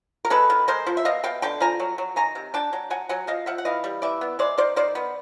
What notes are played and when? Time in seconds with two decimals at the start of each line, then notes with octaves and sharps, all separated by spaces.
0.25 A#4
0.30 G#3 A4 B4
0.50 D#3
0.68 G#3 A#4 C5
0.87 F3
0.97 E5
1.05 B2 D#5 F5
1.24 B2 F5 G5
1.42 D3 G5 A5
1.60 F3 G#5 A#5
1.80 F#3
1.98 F#3
2.16 D#3 G#5 A#5
2.35 C3
2.54 D4 G5 A5
2.73 F#3
2.90 F#3 F#5 G#5
3.09 F#3 F#5 G#5
3.27 F3 D#5 F5
3.46 F3 E5 F#5
3.58 F#5
3.65 E3 D#5 F5
3.84 G3
4.02 E3 D5 E5
4.21 B3
4.39 G#3 C5 D5
4.58 D#3 C5 D5
4.76 D#3 C5 D5
4.95 B3